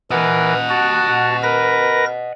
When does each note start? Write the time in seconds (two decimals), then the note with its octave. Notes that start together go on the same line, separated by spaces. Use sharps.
0.11 E3 A#4 D#5 F#5
0.70 F#4 A5
1.43 A#4 B4 A#6